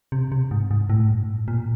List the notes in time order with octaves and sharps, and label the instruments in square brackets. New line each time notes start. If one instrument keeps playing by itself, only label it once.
[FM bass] C3
C3
G#2
G#2
A2
G2
A2
A#2